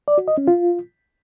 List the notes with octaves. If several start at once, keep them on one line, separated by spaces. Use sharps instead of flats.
D5
F#4
D#5
C#4
F4